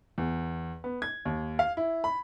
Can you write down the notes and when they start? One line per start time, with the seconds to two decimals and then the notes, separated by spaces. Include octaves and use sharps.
0.18 E2
0.84 B3
1.02 G#6
1.25 D#2
1.59 F5
1.77 E4
2.04 B5